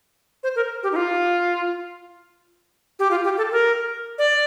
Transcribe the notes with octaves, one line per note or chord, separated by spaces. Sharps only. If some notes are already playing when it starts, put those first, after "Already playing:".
C5
A#4
G4
D#4
F4
G4
F4
G4
A4
A#4
D5